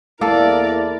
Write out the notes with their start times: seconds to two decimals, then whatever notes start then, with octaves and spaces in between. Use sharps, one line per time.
0.21 E2 A#3 E4 A4 A#4 D5